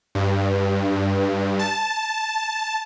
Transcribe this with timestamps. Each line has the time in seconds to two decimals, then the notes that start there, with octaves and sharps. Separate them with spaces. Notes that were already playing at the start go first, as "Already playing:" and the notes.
0.15 G2
1.59 A5